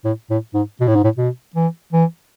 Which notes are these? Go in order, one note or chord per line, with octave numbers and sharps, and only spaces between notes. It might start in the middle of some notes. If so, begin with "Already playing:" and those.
A2
A2
G#2
B2
A2
G#2
A2
B2
E3
E3